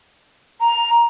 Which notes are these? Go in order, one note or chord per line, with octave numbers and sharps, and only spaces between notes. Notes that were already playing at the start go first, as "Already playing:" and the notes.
A#5